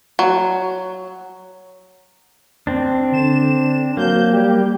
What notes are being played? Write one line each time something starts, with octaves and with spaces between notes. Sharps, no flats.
F#3
C4 D4
D3 E7
F#3 A#3 G6
G3 G4